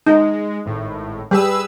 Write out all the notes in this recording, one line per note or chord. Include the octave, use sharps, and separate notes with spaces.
G#3 D#4
G#1 A2
G3 G#4 B4 E6